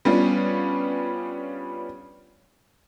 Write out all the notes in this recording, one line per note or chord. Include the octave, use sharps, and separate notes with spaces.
G3 B3 C#4 D4 F4